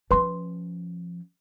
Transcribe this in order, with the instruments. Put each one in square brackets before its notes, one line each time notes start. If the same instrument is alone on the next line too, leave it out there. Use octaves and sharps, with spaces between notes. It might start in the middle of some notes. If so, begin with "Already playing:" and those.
[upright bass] F3 C#4 [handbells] B4 C6